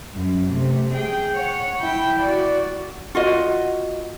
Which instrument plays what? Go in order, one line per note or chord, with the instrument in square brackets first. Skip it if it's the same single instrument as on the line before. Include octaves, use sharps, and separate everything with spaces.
[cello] F#2
C3 A3
G#4 G5
C#5 F#5
E4 G5
F#4 D5
[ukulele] F4 F#4 D#5